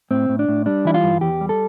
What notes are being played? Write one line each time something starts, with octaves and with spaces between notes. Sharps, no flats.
A2 C4
A2
D4
A2
G3 D4
E3 E4
F4
G2
E2 G4
G3
A4